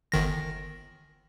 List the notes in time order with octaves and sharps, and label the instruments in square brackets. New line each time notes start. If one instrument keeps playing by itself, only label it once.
[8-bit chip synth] G1 D#3 A#6